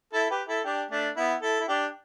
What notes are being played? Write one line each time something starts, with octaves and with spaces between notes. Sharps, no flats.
E4 A4
G4 B4
E4 A4
D4 G4
A3 D4
B3 E4
E4 A4
E4
D4 G4